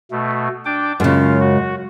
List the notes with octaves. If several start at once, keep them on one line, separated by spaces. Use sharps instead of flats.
B2 A3
D4 G5 D6
F#2 C#3 G#3 F4
F#4